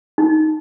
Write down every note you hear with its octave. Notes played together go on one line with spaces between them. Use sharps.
D#4